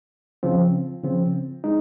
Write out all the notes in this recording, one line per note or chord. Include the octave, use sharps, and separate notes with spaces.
C#3 F3 C4
C#3 F3 C4
G#3 D#4